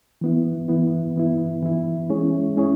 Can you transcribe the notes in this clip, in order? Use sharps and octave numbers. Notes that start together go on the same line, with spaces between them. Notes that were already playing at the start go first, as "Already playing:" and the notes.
E3 B3 E4
E3 B3 E4
E3 B3 E4
E3 B3 E4
G#3 C#4 E4 G#4 C#5
G#3 C#4 E4 G#4 C#5